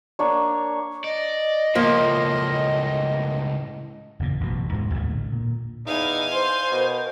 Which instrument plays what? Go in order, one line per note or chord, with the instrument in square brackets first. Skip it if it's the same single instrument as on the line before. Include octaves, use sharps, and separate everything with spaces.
[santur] A#3 D4 C#5
[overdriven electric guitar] D5 [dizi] D#5
[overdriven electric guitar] C#2 A2 [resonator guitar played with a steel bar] F3 A#3
[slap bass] F#1 E2 A#2
A1 F#2 B2
D1 G#1 G#2 G#3
A#1 D#2 A2 A3
D3
A#2
[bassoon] E2 [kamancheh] D#4 E4 [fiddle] F5 G#5
[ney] C5 [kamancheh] C6
[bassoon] B2 [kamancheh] A#4